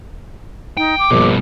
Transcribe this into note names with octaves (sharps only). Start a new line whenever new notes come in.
D#4 G5
D6
A#1 G2 B2